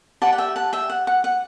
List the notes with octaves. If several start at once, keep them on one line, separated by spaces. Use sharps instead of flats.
G4 B4 D5 F#5 A5
F#5
E5 G5
F#5 A5
E5 G5
F#5
F#5
F#5